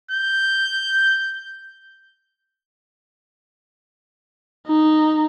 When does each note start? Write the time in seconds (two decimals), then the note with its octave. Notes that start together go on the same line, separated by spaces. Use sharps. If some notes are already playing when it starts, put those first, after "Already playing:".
0.11 G6
4.67 D#4